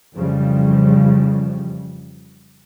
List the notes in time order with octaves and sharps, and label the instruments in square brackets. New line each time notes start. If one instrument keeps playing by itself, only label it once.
[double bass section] F2 C#3 E3 F3 G3